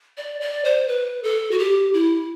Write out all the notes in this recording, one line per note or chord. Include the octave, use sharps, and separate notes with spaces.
D5
D5
C5
B4
A4
F#4
G4
E4